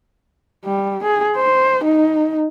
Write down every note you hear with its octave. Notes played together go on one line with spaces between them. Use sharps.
G3
G#4
C5
D#4